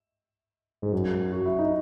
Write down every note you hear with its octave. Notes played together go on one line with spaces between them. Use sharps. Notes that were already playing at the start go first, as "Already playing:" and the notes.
G#2
F#2
F#4
E4
D#4